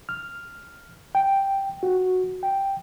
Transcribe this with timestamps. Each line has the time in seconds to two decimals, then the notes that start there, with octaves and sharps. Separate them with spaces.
0.09 F6
1.15 G5
1.83 F#4
2.43 G5